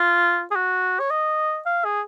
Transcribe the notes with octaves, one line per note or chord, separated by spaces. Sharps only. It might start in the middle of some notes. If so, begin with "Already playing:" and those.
Already playing: F4
G#4
F#4
C#5
D#5
F5
G#4